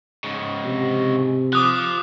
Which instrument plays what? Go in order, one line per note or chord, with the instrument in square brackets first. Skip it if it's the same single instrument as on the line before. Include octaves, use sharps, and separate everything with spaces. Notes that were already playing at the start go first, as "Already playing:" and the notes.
[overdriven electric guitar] G#2 C#3
[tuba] C3
[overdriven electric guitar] F3 [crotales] D6 D#6 F#6